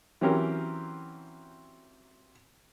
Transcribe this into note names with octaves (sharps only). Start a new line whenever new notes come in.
E3 F#3 C4 C#4 G4 A#4